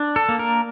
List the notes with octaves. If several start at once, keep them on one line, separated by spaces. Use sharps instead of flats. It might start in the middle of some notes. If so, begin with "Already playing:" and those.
Already playing: D4
A4
A#3
A#4